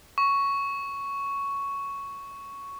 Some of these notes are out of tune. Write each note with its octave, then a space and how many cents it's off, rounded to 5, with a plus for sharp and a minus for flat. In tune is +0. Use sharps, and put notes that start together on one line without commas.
C#6 +5